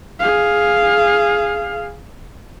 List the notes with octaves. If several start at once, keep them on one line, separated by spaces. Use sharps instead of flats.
G#4 F5